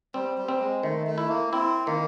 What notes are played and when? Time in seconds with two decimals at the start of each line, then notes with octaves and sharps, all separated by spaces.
0.14 G3 C4
0.38 G3
0.48 C4
0.60 G#3
0.83 D#3 A3
1.07 A3
1.18 E4
1.29 A#3
1.53 C4 E4
1.87 D#3 A#3